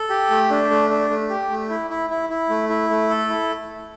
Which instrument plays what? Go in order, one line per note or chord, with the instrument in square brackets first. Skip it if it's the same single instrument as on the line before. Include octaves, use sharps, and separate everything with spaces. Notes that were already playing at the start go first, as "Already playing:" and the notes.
Already playing: [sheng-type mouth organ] A4
G4
A3
D4
A3
D4
A3
G4
A3
E4
E4
E4
E4
A3
E4
A3
A4
E4